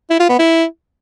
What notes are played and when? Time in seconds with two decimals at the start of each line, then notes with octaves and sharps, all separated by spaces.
0.10 E4
0.20 F4
0.29 B3
0.39 E4